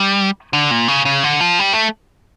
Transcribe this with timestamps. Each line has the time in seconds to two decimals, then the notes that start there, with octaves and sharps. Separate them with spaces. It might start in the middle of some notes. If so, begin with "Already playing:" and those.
Already playing: G3
0.53 D3
0.71 A#2
0.88 C#3
1.05 C#3
1.24 D3
1.41 F3
1.59 G3
1.73 A3